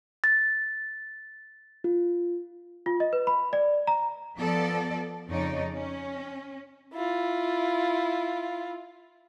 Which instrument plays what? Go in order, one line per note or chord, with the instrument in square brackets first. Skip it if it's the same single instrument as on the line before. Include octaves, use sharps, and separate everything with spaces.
[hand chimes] A6
F4
[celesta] F4
D#5
B4
B5
D5
A#5
[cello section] F3 B3 A4 D5
F2 C#3 D#4 C#5 D5
C#4
[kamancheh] E4 F4